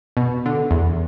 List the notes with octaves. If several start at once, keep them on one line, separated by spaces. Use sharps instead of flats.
B2
D3
E2